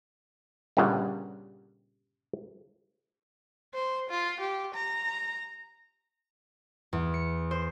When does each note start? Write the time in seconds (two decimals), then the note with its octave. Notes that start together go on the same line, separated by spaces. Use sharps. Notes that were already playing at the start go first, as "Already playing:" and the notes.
0.77 G1 G2 A#2 C#3 G3 F#5
3.74 C5
4.10 F4
4.40 G4
4.74 A#5
6.93 E2
7.14 C#7
7.51 C5